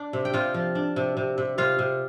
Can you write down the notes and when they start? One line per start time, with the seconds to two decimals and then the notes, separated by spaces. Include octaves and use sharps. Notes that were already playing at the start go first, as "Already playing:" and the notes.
Already playing: D4 D5
0.13 C3
0.25 G5
0.33 C3 F4 F5
0.54 F3
0.75 D4
0.96 C3
1.17 C3
1.38 C3
1.58 C3 F4 F5
1.79 C3